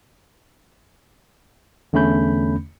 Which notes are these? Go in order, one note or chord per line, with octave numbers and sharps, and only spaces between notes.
E2 D3 A3 C#4 B5 G6